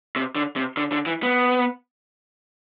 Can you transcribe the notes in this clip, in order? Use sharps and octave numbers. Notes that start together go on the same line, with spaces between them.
C3
D3
C3
D3
D3
E3
B3